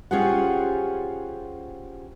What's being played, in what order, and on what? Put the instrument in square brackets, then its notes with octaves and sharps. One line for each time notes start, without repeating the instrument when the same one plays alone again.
[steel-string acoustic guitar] C#4 F4 G4 G#4 C5 F#5